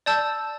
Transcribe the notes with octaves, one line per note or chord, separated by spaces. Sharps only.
D5 A5 E6 G6